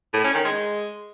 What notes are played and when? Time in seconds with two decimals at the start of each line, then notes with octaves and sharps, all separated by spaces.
0.13 A2
0.24 C#4
0.34 D#3
0.45 G#3